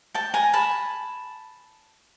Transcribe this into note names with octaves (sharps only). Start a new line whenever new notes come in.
G5 A5
G#5 A#5
A5 B5